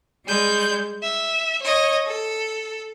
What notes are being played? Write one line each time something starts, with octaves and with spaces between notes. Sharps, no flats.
G3 G#3 G6
E5
C#5 D#5
A4